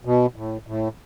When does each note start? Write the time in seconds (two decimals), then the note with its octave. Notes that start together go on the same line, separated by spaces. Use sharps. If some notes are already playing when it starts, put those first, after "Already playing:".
0.05 B2
0.36 A2
0.67 A2